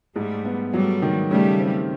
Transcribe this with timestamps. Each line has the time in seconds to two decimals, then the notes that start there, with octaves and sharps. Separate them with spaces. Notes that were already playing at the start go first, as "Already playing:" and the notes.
0.15 G#2 G3 A3
0.45 B3
0.73 F#3 G3 A3
1.02 D#3
1.31 C#3 G3 A3
1.60 C4